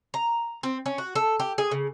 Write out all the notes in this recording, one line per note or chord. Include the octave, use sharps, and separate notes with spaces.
A#5
C4
C#4
F#4
A4
G4
G#4
C#3